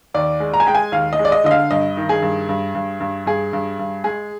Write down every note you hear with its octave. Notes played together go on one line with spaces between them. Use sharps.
D#2 D5
G#3
A#5
G#5
G#3 G5
G#5
D#2 F5
D#5
G#3
D5
D#5
D3 D#5
F5
G2 D#5
D#3
G#4
G2
G2
G2
G2
G2 G#4
G2
G2
G#3 G#4